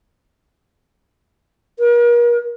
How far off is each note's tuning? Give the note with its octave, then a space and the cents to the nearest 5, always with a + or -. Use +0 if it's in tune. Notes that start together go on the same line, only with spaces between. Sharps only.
A#4 +40